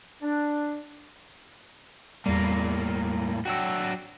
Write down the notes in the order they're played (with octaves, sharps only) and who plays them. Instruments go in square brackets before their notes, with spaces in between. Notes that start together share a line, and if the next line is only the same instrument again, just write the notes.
[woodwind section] D4
[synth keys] E2 G3 [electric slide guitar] A2 A#3
[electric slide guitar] F#3 D4 F#4 [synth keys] G5 E6